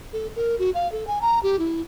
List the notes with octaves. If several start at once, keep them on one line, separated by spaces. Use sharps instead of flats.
A4
A#4
F#4
F5
A4
G#5
A#5
G4
E4